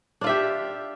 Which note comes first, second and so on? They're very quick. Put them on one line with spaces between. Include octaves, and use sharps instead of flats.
D4 F4 E5 G4